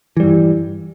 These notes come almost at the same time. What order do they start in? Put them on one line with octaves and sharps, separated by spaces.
E3 G3 G2